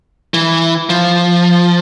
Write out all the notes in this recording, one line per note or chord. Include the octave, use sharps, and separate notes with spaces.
E3
F3